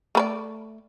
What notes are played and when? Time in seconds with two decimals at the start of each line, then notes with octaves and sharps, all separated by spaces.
0.15 A3 B4 D5